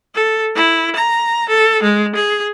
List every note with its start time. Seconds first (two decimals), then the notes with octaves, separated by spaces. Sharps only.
0.15 A4
0.55 E4
0.96 A#5
1.49 A4
1.82 G#3
2.15 G#4